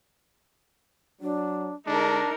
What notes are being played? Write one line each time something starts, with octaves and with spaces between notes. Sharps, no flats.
F#3 D4
D3 G#3 D4 D#4 A#4 A5